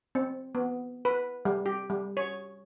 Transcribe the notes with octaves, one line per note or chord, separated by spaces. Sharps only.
C4
B3
B4
G3
G4
G3
C#5